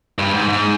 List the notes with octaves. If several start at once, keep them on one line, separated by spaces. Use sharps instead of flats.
G2
G#2
G#2